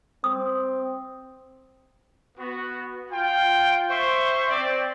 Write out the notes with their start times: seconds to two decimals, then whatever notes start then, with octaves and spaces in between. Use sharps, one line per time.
0.24 C4 D#6
2.38 B3 F#4
3.11 F4 G5
3.89 C5 E5 C6 C#6
4.50 C4 D5